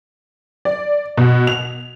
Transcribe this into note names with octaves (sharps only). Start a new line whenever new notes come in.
D5
B2
F7